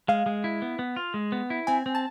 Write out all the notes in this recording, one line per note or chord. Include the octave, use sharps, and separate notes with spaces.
G#3 F5
G#3
E4
B3
B3
F4
G#3
B3
E4
C4 G#5
C4
A5